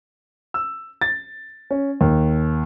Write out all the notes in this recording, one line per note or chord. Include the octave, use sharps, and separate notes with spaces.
E6
A6
C#4
D#2